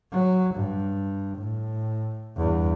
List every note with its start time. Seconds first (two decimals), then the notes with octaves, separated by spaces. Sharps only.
0.12 F#3
0.55 G2
1.37 A2
2.37 E2 G2